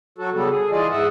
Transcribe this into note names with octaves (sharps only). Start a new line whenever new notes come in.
F#3 F#4 A4
C#3 G3 B3 A4
G#4
E3 F4 G#4 D5 D#5
G#2 D#5 E5 F#5